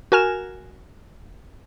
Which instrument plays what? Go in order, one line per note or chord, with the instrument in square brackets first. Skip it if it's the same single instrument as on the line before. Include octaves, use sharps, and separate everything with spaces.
[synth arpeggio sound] F#4 A#4 G#5 F6 E7